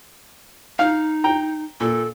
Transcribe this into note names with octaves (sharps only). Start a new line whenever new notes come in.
D#4 F5
G5 A#5
A#2 A4